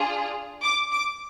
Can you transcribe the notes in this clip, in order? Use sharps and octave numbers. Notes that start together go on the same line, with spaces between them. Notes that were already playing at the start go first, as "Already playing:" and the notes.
Already playing: D4 F4 G#4
D6
D6